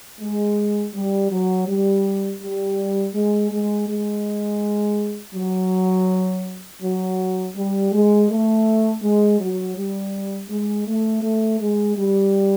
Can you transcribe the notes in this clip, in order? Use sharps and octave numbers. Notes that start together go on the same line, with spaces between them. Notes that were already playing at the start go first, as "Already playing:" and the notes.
G#3
G3
F#3
G3
G3
G#3
G#3
G#3
F#3
F#3
G3
G#3
A3
G#3
F#3
G3
G#3
A3
A3
G#3
G3